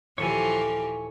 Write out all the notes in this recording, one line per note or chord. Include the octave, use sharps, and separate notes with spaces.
D#1 E3 F3 G4 A4 C#5 G#5 E7